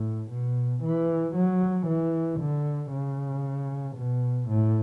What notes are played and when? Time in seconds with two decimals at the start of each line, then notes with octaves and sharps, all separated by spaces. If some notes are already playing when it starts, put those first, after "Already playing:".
Already playing: A2
0.30 B2
0.83 E3
1.35 F#3
1.87 E3
2.39 D3
2.91 C#3
3.96 B2
4.48 A2